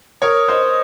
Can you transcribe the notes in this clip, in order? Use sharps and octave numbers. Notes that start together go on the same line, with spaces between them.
A#4 C#5 D#6
C5 D#5